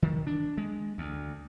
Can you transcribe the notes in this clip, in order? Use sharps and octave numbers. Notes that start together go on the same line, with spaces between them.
D#3
D4
G#3
D2